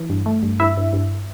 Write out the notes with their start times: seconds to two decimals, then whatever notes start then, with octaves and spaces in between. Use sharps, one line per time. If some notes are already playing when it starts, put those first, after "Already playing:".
Already playing: E3
0.09 G2
0.26 A3
0.43 G2
0.60 G2 E4 E5
0.77 G2
0.93 G2